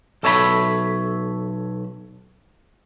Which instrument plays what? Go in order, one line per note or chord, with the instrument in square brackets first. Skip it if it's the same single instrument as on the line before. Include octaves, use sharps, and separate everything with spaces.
[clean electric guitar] B1 A4 C#5 E5 A5 B5